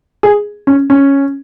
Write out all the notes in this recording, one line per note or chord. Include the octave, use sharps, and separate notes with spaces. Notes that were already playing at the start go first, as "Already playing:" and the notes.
G#4
C#4
C#4